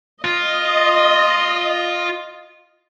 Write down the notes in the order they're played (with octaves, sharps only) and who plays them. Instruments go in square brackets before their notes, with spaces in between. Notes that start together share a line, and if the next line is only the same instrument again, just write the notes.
[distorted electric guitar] F4 [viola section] D#5